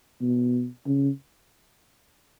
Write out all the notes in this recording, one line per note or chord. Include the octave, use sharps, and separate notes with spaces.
B2
C#3